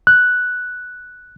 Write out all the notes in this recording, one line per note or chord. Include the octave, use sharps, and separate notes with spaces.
F#6